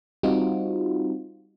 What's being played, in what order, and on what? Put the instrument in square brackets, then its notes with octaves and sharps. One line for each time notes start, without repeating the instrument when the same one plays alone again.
[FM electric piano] G3 C4 D#4 F4 F#4